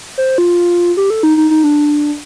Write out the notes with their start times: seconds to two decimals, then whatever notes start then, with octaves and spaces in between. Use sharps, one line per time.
0.18 C5
0.38 F4
0.97 G4
1.10 A4
1.23 D#4
1.37 D#4
1.50 D#4
1.64 D4